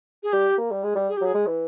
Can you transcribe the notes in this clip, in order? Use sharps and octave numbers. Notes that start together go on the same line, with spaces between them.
G#4
G3 G4
A#3
G3
G#3
G3
G#4
G4
F#3 G#4
G#3
E3